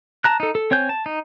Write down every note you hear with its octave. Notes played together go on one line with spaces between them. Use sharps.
A5 A#5 F#6
D#4 A4
A4
C4 C#5 G#5 G6
A5
D#4